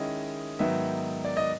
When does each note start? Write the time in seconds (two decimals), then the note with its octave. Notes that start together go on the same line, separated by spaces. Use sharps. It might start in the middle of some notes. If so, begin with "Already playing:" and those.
Already playing: D#3 G#3 C#4 E4 D#5
0.59 G#2 D#3 F#3 B3 D#4 E5
1.25 D5
1.37 D#5